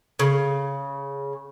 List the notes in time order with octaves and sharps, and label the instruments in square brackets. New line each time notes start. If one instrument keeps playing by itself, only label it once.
[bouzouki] C#3